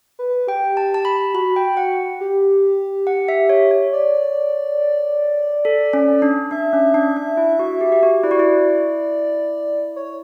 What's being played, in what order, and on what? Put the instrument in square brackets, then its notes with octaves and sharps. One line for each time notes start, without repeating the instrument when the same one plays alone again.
[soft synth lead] B4
[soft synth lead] G4 [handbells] G5
[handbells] A5
A5
B5
[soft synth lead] F#4 [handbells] B5
[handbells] G5
F#5
[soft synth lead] G4
[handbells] F#5
E5
C#5
C#5
[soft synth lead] D5
[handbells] A4
C#4
D4
[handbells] D4 [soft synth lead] E5
[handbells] C#4
D4
D4
E4
F#4
G4
G4
F#4
[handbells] E4 [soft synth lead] D5
[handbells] F#4
E4
[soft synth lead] C#5